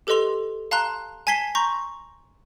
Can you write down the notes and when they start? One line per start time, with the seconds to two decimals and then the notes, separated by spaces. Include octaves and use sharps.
0.07 G4 A4 B4 D#5 C6 F7
0.71 F5 A5 A#5 C6 F#6
1.27 G#5 A5 G#6 B6 C7 G7
1.55 A#5 C6 C#6 G6 A#6